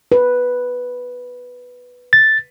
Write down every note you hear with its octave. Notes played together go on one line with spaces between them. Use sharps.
B4
A6